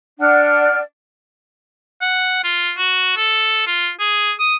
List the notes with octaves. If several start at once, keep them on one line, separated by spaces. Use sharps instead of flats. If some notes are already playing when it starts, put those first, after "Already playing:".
D4 D5 F#5 F6
F#5
F4
F#4
A4
F4
G#4
D#6